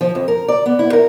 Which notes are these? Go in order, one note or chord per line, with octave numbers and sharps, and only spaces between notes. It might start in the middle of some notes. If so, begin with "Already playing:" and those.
F3
F2
A#4
D5
B3
E4
A#4